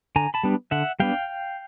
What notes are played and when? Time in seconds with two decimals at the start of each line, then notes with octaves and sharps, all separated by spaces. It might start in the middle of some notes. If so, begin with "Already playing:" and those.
0.16 D3 G#5 A#5
0.34 A5 B5
0.43 G3 B3 D4
0.71 D3 E5 F#5
1.00 G3 B3 D4 F5 G5